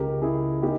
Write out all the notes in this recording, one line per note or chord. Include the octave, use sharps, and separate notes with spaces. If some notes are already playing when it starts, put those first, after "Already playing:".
Already playing: C#2 G4 A#4
C#3 E4 G#4
A#3 D#4 G4